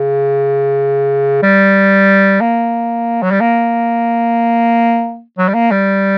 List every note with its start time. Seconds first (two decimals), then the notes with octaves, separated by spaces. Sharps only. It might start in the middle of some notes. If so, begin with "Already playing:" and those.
Already playing: C#3
1.42 G3
2.41 A#3
3.23 F#3
3.31 G3
3.41 A#3
5.38 F#3
5.49 G3
5.54 A#3
5.71 G3